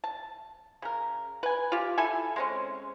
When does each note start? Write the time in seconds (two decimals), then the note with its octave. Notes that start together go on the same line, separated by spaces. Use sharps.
0.04 A5
0.82 C#3 A#4
1.43 B4 G#5
1.72 F4 G4
1.98 E4 A4 G#5
2.36 G#3 C4 C#4